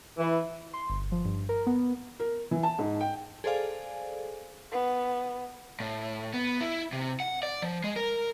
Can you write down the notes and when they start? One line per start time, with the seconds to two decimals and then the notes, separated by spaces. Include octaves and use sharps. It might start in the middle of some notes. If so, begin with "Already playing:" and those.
0.17 E3
0.74 C6
0.90 G1
1.12 F3
1.25 G2
1.49 A#4
1.67 B3
2.20 A#4
2.51 E3
2.63 A5
2.79 G#2
3.01 G5
3.44 G#4 A4 C5 D5 F5 G#5
4.72 B3
5.80 A2
6.34 B3
6.61 E4
6.93 C3
7.20 F#5
7.43 D5
7.62 F3
7.84 G#3
7.96 A#4